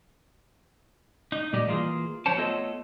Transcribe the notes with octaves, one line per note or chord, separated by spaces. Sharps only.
D#4
A#2 G3 G4 D5 D#5
E3 A#3 F4 G#4
F3 F#3 D4 C5 C#5 A5
A3 B3 F4 A4 C#5 D#5